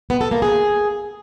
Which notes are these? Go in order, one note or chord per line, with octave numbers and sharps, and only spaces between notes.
B3
A4
A#3
G#4